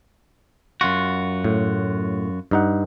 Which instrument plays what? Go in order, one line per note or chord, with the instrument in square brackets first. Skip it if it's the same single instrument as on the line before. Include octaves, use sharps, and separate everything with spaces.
[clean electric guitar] F#2 F4 F#4
[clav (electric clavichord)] A2
G2 D#4 F#5